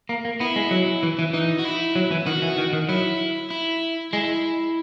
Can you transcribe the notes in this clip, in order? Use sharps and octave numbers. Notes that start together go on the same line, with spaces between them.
A#3
A#3
B3 E4
G#3
F#3
E3
E3
E3 D#4
F#4
E4
F#3
E3
D#3 F#4
E3
D#3
D#3
F#3 E4
E4
G#3 E4